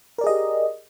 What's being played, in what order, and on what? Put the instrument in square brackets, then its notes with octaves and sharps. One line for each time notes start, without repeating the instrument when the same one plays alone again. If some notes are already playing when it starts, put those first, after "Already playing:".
[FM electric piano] A#4
D5
G#4
D#5
G4